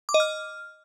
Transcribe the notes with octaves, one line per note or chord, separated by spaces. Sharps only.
D6
D#5
F6